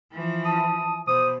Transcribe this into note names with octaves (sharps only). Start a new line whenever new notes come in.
E3 F3
A5 D#6
B2 C5 D#6